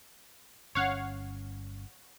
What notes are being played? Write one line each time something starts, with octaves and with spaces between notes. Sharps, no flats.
G1 C#4 C#5 F5 F#5